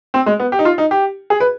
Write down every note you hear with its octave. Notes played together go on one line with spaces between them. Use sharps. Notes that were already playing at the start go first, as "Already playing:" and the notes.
C4
G#3
B3
G4
D#4
F4
D#4
G4
G#4
B4